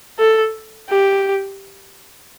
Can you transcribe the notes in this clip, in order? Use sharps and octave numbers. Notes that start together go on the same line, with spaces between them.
A4
G4